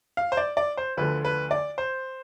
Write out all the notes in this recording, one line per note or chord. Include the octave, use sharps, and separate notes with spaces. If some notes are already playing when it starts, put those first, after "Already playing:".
F5
C5
D5
D5
C5
D2 D3 F3 A3 B4
B4
D5
C5